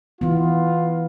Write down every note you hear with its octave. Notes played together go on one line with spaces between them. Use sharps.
E3 B3 F4